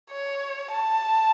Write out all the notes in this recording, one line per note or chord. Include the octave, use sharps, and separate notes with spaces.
C#5
A5